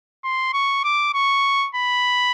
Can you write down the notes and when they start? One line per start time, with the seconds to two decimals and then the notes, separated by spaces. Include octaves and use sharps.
0.24 C6
0.53 C#6
0.84 D6
1.14 C#6
1.75 B5